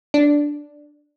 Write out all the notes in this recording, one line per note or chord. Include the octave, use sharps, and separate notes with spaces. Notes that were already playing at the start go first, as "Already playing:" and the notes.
D4